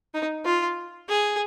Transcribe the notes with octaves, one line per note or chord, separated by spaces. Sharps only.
D#4
F4
G#4